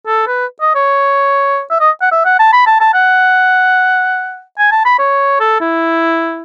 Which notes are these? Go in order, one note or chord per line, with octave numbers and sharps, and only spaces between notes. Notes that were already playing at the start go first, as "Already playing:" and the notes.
A4
B4
D#5
C#5
E5
D#5
F#5
E5
F#5
A5
B5
A5
A5
F#5
G#5
A5
B5
C#5
A4
E4